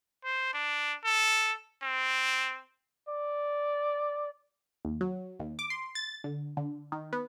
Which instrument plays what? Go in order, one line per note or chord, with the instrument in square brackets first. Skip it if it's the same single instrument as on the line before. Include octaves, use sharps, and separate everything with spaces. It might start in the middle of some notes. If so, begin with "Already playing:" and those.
[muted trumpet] C5
D4
A4
C4
[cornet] D5
[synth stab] D#2
F#3
D#2
D6
C6
A6
D3
D3
D#3
B3